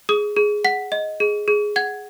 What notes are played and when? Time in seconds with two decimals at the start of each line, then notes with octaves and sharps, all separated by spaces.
0.09 G#4 D#6
0.36 G#4
0.64 F#5 B6
0.92 D#5
1.20 G#4
1.48 G#4
1.76 F#5 G#6